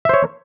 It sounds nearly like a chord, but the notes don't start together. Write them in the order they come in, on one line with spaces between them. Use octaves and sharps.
E5 C5 C#5